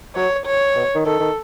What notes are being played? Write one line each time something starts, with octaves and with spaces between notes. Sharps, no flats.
F#3 C#5
C#5
B2
D#3
D#3 A4
D#3